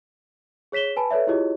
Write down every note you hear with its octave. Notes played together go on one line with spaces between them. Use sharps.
G#4 C#5 B6 E7 G7
B4 G#5 A5 B5
A4 B4 C#5 D5 E5
E4 F4 G4 G#4 C#5 D#5